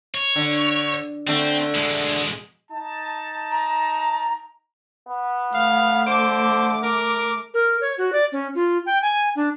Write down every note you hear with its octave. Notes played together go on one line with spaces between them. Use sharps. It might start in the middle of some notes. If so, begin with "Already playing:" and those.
C#5
D3
D3 A3 C4
B2 G#3
D#4 A5
A#5
B3
A3 F5
D3 C5 D6
A#4
A#4
C#5
F#4
D5
C#4
F4
G5
G#5
D4